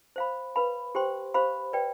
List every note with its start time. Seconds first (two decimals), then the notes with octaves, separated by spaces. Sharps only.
0.16 C5 F5 B5
0.56 B4 F5 B5
0.95 G4 C5 G5 C6
1.34 G4 C5 F5 B5
1.73 B4 D5 G5